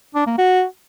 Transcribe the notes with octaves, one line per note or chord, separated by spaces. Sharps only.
D4
A#3
F#4